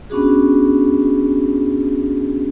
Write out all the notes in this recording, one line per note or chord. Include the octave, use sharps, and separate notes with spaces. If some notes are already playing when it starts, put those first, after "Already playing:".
B3 C#4 D4 F#4 G#4